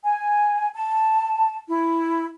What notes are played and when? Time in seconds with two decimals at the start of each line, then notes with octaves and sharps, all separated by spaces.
0.04 G#5
0.73 A5
1.68 E4